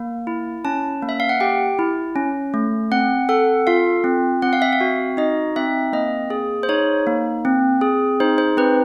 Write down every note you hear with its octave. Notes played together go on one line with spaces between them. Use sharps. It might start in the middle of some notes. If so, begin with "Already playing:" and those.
Already playing: A#3
E4
C#4 A5
A#3
E5
F5
F#5
G4 G5
E4
C#4
A3
C4 F#5
A4 F#5
F4 F5
C4
C4 F#5
F5
E5
F5
F#4
D#4 D#5
C4 E5
A#3 D#5
G#4
C5
D#4 C#5
A#3
C4
G#4
D#4 C5
C5
C4 B4